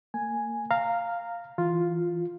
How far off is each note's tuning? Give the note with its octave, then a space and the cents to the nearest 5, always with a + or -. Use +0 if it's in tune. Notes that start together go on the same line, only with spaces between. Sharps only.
A#3 -35 G#5 +0
F5 +0 A#5 -15
E3 +0 F4 +0